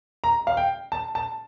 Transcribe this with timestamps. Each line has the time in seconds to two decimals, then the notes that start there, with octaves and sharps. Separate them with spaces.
0.24 A#5
0.47 F5
0.57 G5
0.92 A5
1.15 A5